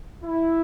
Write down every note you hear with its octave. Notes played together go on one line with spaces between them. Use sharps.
E4